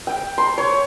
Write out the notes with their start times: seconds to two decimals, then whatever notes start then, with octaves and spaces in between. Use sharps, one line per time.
0.07 G5
0.38 C6
0.58 C#5